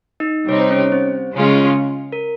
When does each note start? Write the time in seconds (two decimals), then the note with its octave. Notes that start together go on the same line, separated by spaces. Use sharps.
0.20 D#4 D#5
0.48 C3 G3 C4 D#4 C#5
0.60 C5
0.71 C#4 C#5
0.92 C4 C5
1.36 C#3 G#3 C#4 F4
2.12 A#4